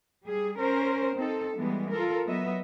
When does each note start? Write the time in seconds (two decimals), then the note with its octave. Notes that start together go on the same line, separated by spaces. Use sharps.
0.25 G3 G#4
0.58 C#4 A#4 C5
1.16 C4 D#4 A4
1.56 E3 G3 G#3 B3
1.91 F4 A4 A#4
2.26 F#3 B3 D#5 E5